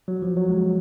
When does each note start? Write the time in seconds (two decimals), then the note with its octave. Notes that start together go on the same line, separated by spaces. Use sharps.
0.08 F#3
0.22 F3
0.36 F#3
0.49 G#3